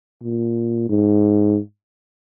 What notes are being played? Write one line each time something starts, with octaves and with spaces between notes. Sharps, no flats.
A#2
G#2